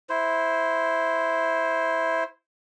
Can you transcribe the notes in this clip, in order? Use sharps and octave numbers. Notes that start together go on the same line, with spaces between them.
E4 C5